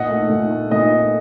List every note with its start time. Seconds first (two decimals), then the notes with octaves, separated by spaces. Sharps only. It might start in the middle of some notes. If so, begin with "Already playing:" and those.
Already playing: A#2 D#5 F#5
0.09 A3
0.30 A#2
0.50 A3
0.71 A#2 D#5
0.93 A3